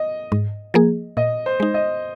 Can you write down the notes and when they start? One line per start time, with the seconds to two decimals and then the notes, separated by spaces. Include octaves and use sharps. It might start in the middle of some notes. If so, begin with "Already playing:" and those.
Already playing: D#5
0.32 G#2
0.74 F3 A#3 G#4
1.17 A#2 D#5
1.46 C5
1.60 G#3 D#4
1.74 D#5